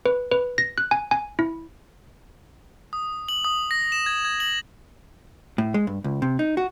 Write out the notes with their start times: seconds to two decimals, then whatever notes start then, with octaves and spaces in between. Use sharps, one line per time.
0.06 B4
0.32 B4
0.58 A#6
0.78 F#6
0.91 G#5
1.11 G#5
1.39 E4
2.93 D#6
3.29 F#7
3.45 D#6
3.71 A#6
3.92 E7
4.06 G#6
4.25 G#6
4.40 F#7
5.58 A2
5.74 G#3
5.87 G2
6.04 C#2
6.22 C3
6.39 D#4
6.57 F#4